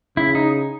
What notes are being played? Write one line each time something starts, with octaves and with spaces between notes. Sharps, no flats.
C#3 E4
D#4